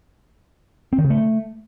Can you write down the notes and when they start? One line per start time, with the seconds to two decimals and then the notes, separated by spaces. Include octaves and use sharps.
0.93 C4
0.98 D#3
1.04 C#3
1.10 A3